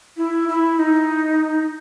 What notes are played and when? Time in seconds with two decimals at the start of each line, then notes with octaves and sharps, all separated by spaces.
0.17 E4
0.49 E4
0.79 D#4